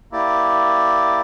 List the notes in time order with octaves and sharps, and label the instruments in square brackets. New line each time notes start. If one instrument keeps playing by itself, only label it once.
[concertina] A#3 E4 G4 D5